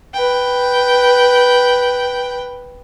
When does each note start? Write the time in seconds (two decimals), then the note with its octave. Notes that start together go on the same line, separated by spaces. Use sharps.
0.14 B4 G5